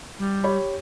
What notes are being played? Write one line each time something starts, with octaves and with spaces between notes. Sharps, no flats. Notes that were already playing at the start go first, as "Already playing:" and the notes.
G3
G4 C#5 B5